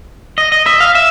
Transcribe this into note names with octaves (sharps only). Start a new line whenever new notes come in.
D#5
D#5
E5
F5
E5